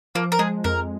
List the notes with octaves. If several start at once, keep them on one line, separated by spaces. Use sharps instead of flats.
F3 A#3
A#4
G#3 G#4
F2 A#4